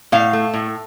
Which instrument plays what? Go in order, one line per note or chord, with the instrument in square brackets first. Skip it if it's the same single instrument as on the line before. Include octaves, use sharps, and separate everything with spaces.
[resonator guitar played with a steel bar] A2 F5
A3
A2